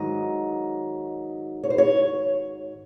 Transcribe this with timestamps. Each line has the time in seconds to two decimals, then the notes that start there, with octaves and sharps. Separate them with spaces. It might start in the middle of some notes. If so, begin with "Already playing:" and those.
Already playing: G#2 D#3 F#3 D#5
1.64 C#5
1.70 C5
1.78 C#5